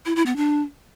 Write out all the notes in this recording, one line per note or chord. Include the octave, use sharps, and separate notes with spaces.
E4
E4
B3
D4